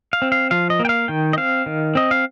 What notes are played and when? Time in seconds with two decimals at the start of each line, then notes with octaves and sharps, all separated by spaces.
0.13 F5
0.22 C4
0.32 F5
0.51 F3 F5
0.70 D#5
0.80 A#3
0.85 G5
0.89 F5
1.08 D#3 G5
1.33 D#5
1.37 C4 F5
1.66 D#3
1.95 C4 D#5
2.11 F5